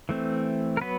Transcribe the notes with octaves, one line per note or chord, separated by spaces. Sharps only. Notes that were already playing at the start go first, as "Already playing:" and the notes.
E3 A3 C4
A#4
F#3 B3 B4